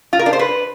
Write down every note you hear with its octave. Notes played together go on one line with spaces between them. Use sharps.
F4
A#4
D4
C5
B4